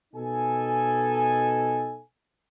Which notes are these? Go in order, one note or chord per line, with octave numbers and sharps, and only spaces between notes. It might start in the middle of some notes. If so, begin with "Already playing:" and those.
B2 D#4 A4 G#5